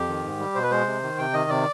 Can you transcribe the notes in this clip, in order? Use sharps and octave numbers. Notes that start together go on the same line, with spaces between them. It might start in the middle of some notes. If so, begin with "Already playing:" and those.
Already playing: F2 G4
D#3
G#2
G3
B2 C5
B4
G#3 C5
C3
D#3
C3 G5
D#3 D#5
C3 D5